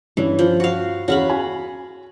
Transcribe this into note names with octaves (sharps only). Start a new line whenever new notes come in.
G2 E3 C#4
F3
F#4 F5
E2 C#4 F#4 G#4 F5 B5
G#5